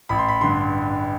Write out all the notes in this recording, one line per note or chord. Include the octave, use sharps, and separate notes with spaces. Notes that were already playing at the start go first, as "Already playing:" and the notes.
A1 B5
C6
B5
G2 D3 C6